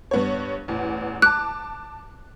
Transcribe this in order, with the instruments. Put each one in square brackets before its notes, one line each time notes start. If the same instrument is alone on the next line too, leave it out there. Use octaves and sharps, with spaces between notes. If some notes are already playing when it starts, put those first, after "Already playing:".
[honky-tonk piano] G2 B3 C#5
A1 E2
[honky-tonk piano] A5 D6 [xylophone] F#6